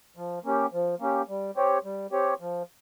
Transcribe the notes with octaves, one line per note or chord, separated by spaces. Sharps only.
F3
A#3 C#4 G4
F3
A#3 C#4 G4
G3
C4 G4 C#5
G3
C4 G4 C#5
F3